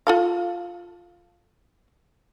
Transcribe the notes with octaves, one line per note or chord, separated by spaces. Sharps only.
F4 A4 F5